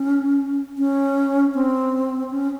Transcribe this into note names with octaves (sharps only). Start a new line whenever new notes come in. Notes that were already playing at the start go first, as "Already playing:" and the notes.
Already playing: C#4
C#4
C4
C#4